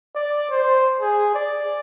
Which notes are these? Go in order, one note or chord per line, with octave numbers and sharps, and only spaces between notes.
D5
C5
G#4
D5